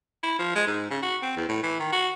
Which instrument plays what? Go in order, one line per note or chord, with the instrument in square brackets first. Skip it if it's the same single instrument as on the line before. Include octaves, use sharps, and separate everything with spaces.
[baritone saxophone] E4
F3
G#3
G#2
C#3
F#4
C4
E2
A2
E3
D#3
F#4